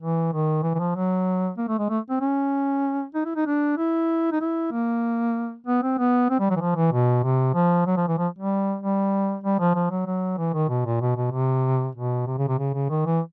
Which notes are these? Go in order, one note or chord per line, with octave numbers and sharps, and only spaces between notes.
E3
D#3
E3
E3
F3
F#3
A#3
A3
G#3
A3
C4
C#4
D#4
E4
D#4
D4
E4
D#4
E4
A#3
B3
C4
B3
C4
G3
F#3
E3
F3
E3
B2
C3
F3
F#3
F3
E3
F3
G3
G3
G3
F3
F3
F#3
F#3
E3
D#3
B2
A#2
B2
B2
C3
B2
C3
C#3
C3
C#3
C#3
D#3
E3